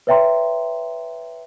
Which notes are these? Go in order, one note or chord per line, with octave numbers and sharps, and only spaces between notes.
B4 C#5 E5 G5 A#5 C6